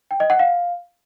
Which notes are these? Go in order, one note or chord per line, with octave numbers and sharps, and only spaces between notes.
G5
D#5
F#5
F5